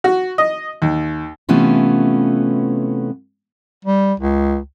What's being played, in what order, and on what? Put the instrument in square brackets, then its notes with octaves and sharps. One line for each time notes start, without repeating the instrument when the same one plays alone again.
[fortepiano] F#4
D#5
D#2
[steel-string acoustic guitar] C3 E3 A3 B3 C#4 F4
[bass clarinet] G3
C#2